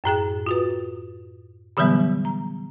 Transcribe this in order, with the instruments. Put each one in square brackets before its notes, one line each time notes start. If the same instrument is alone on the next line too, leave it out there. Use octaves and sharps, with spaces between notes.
[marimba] F#2 A2 G#4 G5
F4 F#4 B4
A#2 D3 E3 F#3 G3 B3
A#5